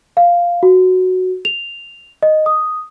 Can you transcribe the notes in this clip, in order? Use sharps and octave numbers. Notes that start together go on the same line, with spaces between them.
F5
F#4
F7
D#5
D#6